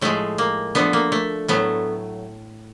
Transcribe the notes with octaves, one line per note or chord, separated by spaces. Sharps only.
A2 F3 G#3 A3
A#3
D3 F3 A3 B3
A#3
A3
A2 F#3 A3 B3